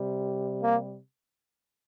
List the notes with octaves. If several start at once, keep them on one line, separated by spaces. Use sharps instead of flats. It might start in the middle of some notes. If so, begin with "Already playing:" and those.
Already playing: C3 G3
A#3